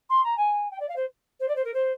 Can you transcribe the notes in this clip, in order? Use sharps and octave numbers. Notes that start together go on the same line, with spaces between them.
C6
A#5
G#5
G5
D5
F5
C5
C5
D5
C5
A#4
C5